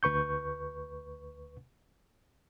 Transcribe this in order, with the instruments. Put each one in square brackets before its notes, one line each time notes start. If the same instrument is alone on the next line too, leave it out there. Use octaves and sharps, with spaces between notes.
[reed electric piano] D2 B4 C#6 G6